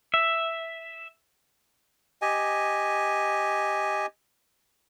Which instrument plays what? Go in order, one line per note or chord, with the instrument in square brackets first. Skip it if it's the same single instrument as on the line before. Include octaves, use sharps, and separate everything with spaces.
[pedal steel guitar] E5
[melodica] G4 D#5 G#5